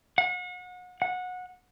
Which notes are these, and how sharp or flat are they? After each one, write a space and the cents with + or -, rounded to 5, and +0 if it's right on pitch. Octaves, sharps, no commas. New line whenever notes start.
F#5 -35
F#5 -20